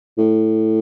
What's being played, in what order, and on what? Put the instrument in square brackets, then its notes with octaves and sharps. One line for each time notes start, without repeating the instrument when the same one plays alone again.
[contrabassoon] A2